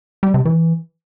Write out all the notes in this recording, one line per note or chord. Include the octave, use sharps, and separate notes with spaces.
G3
C3
E3